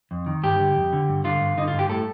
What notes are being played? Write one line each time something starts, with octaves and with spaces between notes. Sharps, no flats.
F2
D#3
G2 G4
D3
F2
D3
G2
D3 F4
G2
D3 D#4
F4
G2
G4
A2 A4